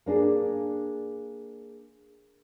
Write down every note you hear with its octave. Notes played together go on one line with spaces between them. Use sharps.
A#3 D4 G#4